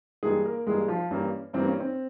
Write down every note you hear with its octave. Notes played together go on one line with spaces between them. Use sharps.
G2 E3 G3 G#3 A#3 G#4
A#3 A#4
G2 E3 G3 G#3 A#3 G#4
F3 F4
G2 E3 G3 A#3 C#4
G2 E3 G3 A#3 C4
C#4
C4